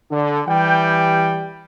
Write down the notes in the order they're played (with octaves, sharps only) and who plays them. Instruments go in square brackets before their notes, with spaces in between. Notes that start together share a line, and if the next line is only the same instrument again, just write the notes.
[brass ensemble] D3
E3 G3 G4 G5